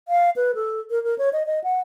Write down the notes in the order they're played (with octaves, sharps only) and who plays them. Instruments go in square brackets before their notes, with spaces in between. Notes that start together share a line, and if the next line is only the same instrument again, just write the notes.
[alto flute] F5
B4
A4
A#4
A#4
C#5
D#5
D#5
F#5